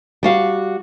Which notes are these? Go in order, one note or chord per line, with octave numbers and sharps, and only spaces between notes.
G3 F#4 F5